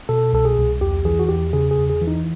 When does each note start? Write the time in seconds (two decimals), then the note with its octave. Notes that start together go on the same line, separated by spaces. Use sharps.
0.09 B2 A4
0.33 C2 A4
0.45 G#4
0.57 C2
0.81 E2 G4
1.05 E3 G#4
1.19 F#4
1.29 E2 G4
1.53 C#3 G#4
1.71 G#4
1.77 E2
1.90 G#4
2.01 E3
2.07 D#4